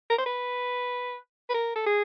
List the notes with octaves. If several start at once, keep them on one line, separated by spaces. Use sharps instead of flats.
A#4
C5
B4
B4
A#4
A4
G#4